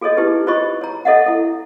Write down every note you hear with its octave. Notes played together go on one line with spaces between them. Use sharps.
F#4 G#4 A4 C#5 D#5
D#4 E4 G4 B4
F4 C5 C#5 D#5 B5 C#6
C#5 A#5
A4 C#5 D#5 E5 F#5
E4 A4